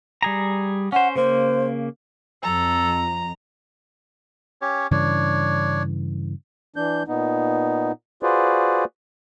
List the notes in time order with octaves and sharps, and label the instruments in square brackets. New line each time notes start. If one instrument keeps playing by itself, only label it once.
[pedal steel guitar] G3 G#4 A#5
[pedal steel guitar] C#4 C5 [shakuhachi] F#5
[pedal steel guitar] C#3 A#3 [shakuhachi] C5
[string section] F2 [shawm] A4 [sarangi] A#5
[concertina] C#4 G4 C#5
[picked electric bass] G2 C#3 E3 [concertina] D4 C#5
[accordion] E3 D4 G6
A#2 B3 D#4
F4 F#4 G#4 B4 C5 D5